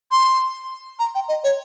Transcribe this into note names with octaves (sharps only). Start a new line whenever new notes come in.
C6
A#5
G5
D#5
C#5